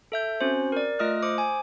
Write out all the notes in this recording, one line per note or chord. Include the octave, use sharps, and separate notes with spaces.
A4 E5 G6
C4 C#4 F#4 C5
A#4 D5
A3 F4 D#5 D#6 F6 F#6
C5 D6 D#6
G#5